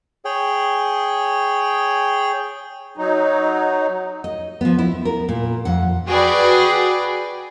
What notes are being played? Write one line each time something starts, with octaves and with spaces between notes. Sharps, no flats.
G#4 C#5 G5
F#3 D#4
D#5
F3 B3
E4
A#4
A#2
F2 F#5
F#4 G#4 B4 D5 G5